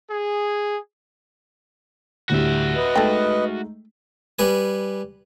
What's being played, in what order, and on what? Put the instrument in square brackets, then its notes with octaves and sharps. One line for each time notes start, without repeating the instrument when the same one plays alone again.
[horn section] G#4
[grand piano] D2 A2 G3 [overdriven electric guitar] F#4 E5
[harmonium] B4 D#5
[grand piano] G#3 A3 D#4 [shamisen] A4 G5
[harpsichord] G3 B4 G#5